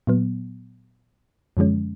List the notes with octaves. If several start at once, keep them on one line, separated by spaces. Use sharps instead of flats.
A#2 F#3 B3
F#2 D3 F3 G#3 C#4